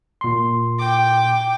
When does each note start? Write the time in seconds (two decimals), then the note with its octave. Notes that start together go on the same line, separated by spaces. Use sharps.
0.21 A#2 C6
0.79 G5 D6